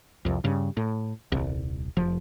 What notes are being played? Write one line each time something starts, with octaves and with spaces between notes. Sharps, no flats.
C2 F2
G2 C#3
A2
D#1 C2
F1 F3